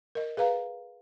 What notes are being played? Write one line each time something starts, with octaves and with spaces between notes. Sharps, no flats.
A#4 D#5
G#4 B4 F5 A#5